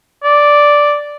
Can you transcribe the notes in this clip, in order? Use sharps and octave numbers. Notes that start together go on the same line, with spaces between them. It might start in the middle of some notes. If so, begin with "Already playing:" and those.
D5